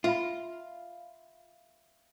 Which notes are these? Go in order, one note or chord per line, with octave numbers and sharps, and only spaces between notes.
F4 E5 F5 B5